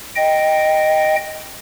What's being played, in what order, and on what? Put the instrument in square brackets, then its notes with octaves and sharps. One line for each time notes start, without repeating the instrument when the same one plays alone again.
[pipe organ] D#5 G5